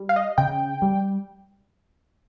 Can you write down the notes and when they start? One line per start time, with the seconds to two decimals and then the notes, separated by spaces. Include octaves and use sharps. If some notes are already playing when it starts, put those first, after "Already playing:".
Already playing: G3
0.09 F5
0.16 D#5
0.38 C#3 G5
0.82 G3